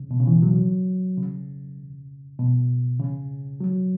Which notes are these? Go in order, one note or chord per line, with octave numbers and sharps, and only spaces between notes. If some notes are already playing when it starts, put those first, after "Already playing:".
Already playing: C#3
B2
C#3
E3
F#3
C#3
B2
C#3
F#3